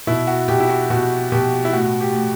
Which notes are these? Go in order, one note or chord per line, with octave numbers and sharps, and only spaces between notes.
B2 E4
F#4
B2 G4
E4
F#4
B2 F#4
B2 G4
E4
A2 F#4
G4
A2